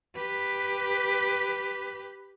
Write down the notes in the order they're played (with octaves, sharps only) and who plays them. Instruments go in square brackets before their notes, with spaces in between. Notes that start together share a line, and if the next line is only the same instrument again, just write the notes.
[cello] G4 B4